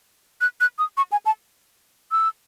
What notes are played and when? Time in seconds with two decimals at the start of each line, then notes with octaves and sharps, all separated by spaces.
0.41 F#6
0.61 F#6
0.79 D#6
0.97 C#6
1.12 G#5
1.26 A5
2.11 E6